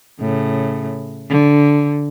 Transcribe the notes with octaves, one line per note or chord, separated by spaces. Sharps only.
A2 C#3
D3